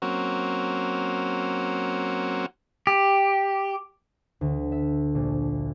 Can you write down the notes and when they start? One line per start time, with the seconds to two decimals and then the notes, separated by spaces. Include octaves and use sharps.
0.02 F#3 A#3 C4 C#4 F#4
2.87 G4
4.41 D2
4.72 E5
5.15 A#1